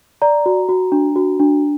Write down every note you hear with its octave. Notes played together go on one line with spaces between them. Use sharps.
D5 A#5
F#4
F#4
D4
F#4
D4